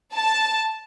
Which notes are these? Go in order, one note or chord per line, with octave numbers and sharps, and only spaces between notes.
A5